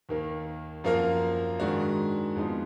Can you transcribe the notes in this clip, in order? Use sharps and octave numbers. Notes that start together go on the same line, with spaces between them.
D#2 D#3 A#3
F#2 F3 A#3 F4 A#4
G#2 D#3 G#3 D4 F#4
F2 F3 G#3 B3 D#4